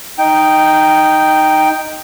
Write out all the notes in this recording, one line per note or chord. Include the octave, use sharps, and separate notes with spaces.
D#4 G5